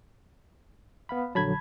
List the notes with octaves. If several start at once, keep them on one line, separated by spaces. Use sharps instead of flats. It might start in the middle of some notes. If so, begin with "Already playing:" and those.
B3 F5 B5
A#1 D3 F#3 A5 B5 G#6